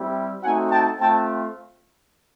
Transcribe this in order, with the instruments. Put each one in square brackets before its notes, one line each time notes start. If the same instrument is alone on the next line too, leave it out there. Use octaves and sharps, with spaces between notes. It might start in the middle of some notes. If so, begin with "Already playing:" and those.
Already playing: [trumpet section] G3 C4 E4 G4
A3 C4 D#4 F#4 F#5 G#5
G5 A5
A3 C4 F4 G5 A5